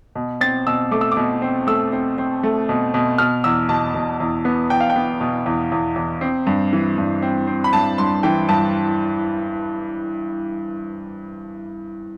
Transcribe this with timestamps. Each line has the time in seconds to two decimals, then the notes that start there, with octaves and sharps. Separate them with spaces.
0.15 B2
0.41 C4 A6
0.67 B2 E6
0.91 A3 D6
1.01 E6
1.11 D6
1.17 B2
1.42 C4
1.67 A3 E6
1.92 C4
2.18 C4
2.43 A3
2.69 B2
2.94 B2
3.18 B2 F6
3.44 E2 E6
3.69 B2 A5
3.94 B2
4.20 E2
4.45 B3
4.70 E2 G5
4.80 F5
4.90 G5
4.96 B3
5.21 B2
5.46 E2
5.72 E2
5.96 E2
6.21 C4
6.47 G2
6.73 E3
6.98 G2
7.22 C4
7.47 C4
7.64 B5
7.73 G2 A5
7.98 G2 C6
8.23 E3 G5
8.49 G2 A5